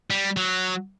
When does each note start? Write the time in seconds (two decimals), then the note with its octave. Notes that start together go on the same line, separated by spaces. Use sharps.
0.10 G3
0.37 F#3